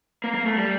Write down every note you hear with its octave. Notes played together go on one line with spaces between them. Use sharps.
A#3
A#3
A3
G3